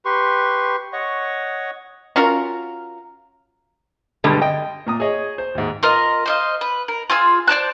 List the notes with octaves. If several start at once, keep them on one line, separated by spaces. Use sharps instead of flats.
G4 B4 C6 C#6
C#5 D#5 F#5 C#6
C#4 F4 F#4 A#4
G2 B2 D3 G3 G#3
D#5 G5
A#2 A#5 D#6
G#4 C#5 D#5
C5
D#2 G#2
F4 A#4 D#5
C5 D#5 F5
B4
A#4
F4 G#4 E6
C5 D5 A5 F#6